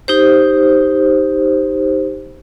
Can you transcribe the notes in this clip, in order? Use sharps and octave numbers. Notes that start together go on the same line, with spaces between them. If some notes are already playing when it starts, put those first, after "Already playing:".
D#4 G4 C5